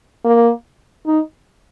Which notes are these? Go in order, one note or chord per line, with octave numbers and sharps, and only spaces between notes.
A#3
D#4